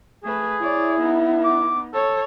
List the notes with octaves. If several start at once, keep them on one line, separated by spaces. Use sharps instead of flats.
A3 G#4 B4
E4 C#5 D5
B3 D#4
D6
A4 C#5